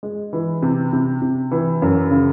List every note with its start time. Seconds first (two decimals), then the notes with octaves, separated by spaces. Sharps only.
0.03 G#3
0.33 E3
0.62 C3
0.93 C3
1.22 C3
1.51 E3
1.82 F#2
2.11 C#3